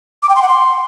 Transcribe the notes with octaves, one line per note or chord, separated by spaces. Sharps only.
D6
G5
C6
F#5
C6